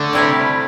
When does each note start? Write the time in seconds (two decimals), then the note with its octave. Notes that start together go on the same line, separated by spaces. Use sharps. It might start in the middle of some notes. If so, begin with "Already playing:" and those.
Already playing: D3 A3
0.13 C3 G3 E4 G4